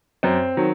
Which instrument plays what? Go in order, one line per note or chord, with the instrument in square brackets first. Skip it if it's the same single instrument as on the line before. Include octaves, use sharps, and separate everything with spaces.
[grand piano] F#2 C4
D#3 F#3